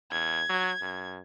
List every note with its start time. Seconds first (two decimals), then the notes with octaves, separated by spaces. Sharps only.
0.11 E2 G#6
0.49 F#3
0.82 F#2